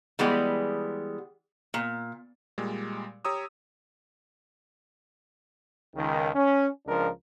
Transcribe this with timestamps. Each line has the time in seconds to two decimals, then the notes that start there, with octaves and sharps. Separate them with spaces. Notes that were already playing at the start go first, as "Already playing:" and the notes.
0.19 E3 G3 G#3 B3 G4 G#4
1.74 A#2
2.58 A#2 G3 G#3
3.25 G4 C#5 A#5 D#6 E6
5.96 C#2 D#3
6.34 C#4
6.87 C#2 F3 D4 A#4